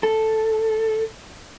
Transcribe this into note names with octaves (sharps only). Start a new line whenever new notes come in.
A4